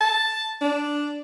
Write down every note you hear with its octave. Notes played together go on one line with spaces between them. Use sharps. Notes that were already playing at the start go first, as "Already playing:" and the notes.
A5
D4